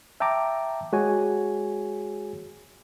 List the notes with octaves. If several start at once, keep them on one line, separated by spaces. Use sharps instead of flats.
E5 G5 A5 A#5 D6
G#3 F#4 G#4 C#5 G#5